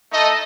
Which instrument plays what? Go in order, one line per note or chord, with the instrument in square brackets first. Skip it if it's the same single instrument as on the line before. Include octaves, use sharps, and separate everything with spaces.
[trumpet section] A3 D#4 A4 D#5